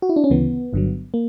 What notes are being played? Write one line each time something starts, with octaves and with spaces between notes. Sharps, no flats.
F#4
E4
D4
C#4
D2 C#3 E3 B3
G1 G2 D3 F#3
A#3